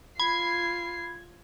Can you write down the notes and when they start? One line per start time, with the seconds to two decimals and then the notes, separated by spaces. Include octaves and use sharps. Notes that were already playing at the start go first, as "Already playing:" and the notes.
0.20 F4 B5 G#6 C7